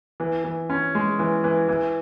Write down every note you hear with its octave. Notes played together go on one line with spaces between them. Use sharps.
E3
E3
C#4
G#3
E3
E3
E3